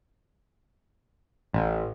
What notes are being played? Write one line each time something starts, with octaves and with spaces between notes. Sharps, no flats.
A1